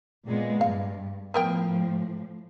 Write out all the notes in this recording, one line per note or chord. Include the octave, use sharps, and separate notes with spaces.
A#2 G#3 B3
G2 F5
A2 F3 B3 A#4 G5